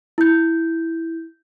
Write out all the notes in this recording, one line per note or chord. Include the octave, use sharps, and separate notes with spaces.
E4 G6